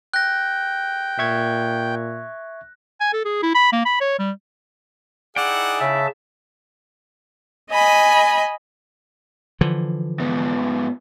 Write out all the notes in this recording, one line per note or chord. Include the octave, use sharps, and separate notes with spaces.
G5 F#6 A#6
A#2 E5 C#6 G#6
G#5
A4
G#4
E4
B5
A#3
B5
C#5
G3
D#4 E4 G#4 D5 F#5 G5
C#3 E5 A5
D#5 G#5 B5
D3 E3 F3
G#2 B3